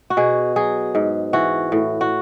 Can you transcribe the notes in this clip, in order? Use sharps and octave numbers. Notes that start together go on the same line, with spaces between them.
F#4
B2 G#4
F#3 G#4
G#2
E3 F#4
A2
F#4